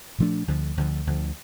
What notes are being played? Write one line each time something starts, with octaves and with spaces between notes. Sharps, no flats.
A#2 F3 A3 D4
D2 D3 F3
D2 D3 F3
D2 D3 F3